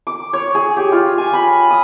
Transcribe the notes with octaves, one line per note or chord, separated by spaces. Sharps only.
D6
C#5
G#4
G4
F4
G#5
B5
D#6